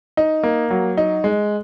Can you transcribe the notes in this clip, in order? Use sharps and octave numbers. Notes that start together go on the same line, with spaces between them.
D#4
A#3
F#3
D#4
G#3